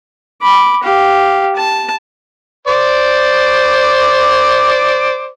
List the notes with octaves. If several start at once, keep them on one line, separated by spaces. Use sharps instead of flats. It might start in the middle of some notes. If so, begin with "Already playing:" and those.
B5 D6
G4 F5
A5
C5 D5 D6